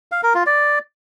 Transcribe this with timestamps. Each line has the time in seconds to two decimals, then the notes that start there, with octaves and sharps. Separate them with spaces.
0.12 F5
0.23 A#4
0.35 F4
0.46 D5